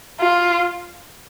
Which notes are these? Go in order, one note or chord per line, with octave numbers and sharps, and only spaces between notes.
F4